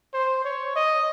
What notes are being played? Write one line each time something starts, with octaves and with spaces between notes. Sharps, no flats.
C5
C#5
D#5